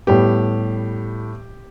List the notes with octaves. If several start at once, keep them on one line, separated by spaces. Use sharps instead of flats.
A2 G3 B3 G4